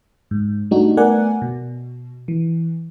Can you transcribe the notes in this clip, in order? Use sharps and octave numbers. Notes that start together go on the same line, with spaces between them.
G#2
G3 A3 D4 D#4 F#4
A3 B3 A#4 D5 F#5 G#5
B2
E3